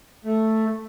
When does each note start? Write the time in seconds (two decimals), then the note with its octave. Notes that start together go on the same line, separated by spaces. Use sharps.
0.25 A3